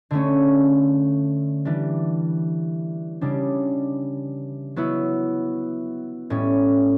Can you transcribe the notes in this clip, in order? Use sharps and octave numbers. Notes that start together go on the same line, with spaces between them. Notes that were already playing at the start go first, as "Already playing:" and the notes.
D3 A3 C#4
E3 G3 D4
C#3 G3 D4
F#3 B3 E4
A2 G3 C#4